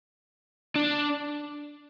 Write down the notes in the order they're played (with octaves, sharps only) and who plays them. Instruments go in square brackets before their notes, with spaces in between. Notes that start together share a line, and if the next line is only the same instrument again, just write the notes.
[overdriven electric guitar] D4